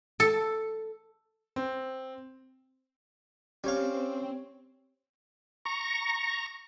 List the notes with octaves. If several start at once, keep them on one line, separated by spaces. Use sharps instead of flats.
A4
C4
G3 C4 C#4 C#5 F5
A#5 C#6